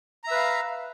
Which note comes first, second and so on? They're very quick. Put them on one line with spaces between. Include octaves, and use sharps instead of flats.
A#5 E5 B4 F5